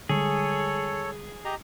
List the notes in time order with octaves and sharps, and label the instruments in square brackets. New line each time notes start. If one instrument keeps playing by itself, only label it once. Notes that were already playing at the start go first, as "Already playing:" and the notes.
[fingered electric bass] D3 G3 G#3 [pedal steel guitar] G#4 [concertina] A4 C#5
[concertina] G4 D#5 A#5